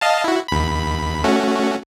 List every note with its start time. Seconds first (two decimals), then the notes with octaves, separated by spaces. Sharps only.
0.01 D#5 F5 A5
0.24 E4 F#4
0.48 D#2 B5
1.24 A3 C#4 F#4